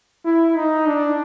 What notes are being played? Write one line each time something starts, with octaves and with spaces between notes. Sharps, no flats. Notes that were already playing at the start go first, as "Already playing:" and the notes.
E4
D#4
D4